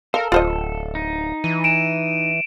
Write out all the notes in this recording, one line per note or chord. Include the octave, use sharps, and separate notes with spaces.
A4 A#4 F5
D1 F4 C5 D#5
D#4
E3 D#7
D7 E7